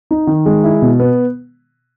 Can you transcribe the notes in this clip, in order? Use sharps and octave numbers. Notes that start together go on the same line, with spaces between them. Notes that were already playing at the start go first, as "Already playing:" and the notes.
D#4
D#3
G#3
E4
B2
B3